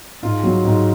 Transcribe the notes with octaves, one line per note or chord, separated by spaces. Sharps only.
G#2 F4
F#3
G#2